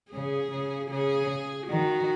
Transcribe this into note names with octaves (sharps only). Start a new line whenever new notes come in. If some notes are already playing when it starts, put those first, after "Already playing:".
C#3 G#4
C#3
C#3 G#4
D#3 F#4